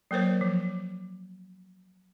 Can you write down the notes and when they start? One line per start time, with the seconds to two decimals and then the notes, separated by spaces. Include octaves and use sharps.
0.11 F#3 A#3 A#4 C5 C#5
0.41 F3